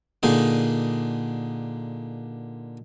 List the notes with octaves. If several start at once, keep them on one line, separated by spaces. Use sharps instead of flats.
A#2 D3 D#4 G#4